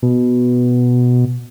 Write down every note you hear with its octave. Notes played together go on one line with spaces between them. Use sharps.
B2